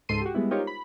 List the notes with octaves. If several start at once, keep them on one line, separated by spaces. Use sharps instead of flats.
C#2 G#2 A4 C6 C7 D#7
F#4 G4
G3 G#3 B3 E4
D#4 F4 G4 A#4 C5 C#5
B5